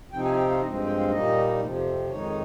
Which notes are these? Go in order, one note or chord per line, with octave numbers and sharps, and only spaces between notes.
C3 F3 C4 D#4 G5
G#5
G5
F5
G2 F3 G#3 C4 D#5
C5
G5
F5
A#2 G3 A#3 D#4 D#5
F2 C3 F3
F2 D#3 G#3 D#4 C#5